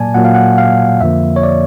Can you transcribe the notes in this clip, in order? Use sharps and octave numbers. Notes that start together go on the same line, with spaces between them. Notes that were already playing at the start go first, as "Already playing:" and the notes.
Already playing: A#2 F#3 A#3 D5 G#5 A5
A#2 F#3 A#3 F#5
F5
F#5
F5
F2 D3 F3 A#3 E5
C#5
D5